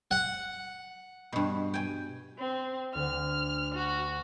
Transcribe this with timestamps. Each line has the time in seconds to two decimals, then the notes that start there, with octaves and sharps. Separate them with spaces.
0.11 F#5
1.32 G2 B2
1.74 G5 G#5
2.38 C4
2.95 D2 F6
3.75 F#4